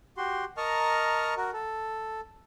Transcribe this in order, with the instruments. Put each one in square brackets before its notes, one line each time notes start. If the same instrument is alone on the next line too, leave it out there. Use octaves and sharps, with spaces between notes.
[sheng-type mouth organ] F#4 G4 C6
A#4 D#5 A5 A#5 C#6 F6
F#4 A#4
A4